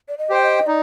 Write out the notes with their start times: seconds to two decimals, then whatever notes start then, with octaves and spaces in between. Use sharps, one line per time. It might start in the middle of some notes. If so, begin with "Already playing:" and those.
0.08 D5
0.18 D#5
0.30 G4 C5 G5
0.42 D#5
0.67 D#4 D5